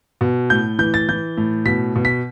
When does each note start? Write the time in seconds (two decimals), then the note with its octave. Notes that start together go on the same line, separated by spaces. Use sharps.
0.21 B2
0.50 A2 G6
0.79 E3 G6
0.94 A6
1.09 E3 G6
1.37 A2
1.65 B2 B6
1.96 B2
2.05 B6